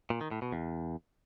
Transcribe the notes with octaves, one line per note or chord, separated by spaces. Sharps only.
A#2
D#3
A2
B2
E2